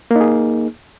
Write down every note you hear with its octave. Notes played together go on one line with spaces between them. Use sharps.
A#3 D#4 G#4